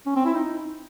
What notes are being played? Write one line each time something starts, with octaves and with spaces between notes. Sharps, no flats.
C#4
C4
E4
D#4